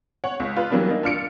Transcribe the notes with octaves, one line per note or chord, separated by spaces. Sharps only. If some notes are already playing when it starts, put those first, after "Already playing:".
C#5 F#5
C#2
F4 B4
E3 F#3 G3 A#3 B3 D4
A#3 D#4
D4 F4 F6 C#7 D7